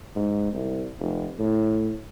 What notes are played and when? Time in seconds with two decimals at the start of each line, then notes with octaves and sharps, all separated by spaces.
0.16 G#2
0.53 C2
0.99 F1
1.39 A2